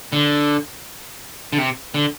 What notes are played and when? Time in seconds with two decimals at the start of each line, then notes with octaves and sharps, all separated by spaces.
0.13 D3
1.53 D3
1.58 C3
1.94 D3